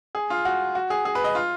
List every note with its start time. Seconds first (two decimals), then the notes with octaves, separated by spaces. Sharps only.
0.15 G#4
0.30 F4
0.45 F#4
0.75 F#4
0.90 G#4
1.05 G#4
1.15 B4
1.24 D#5
1.35 F4